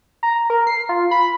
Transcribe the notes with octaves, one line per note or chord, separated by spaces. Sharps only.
A#5
A#4
C7
F4
B5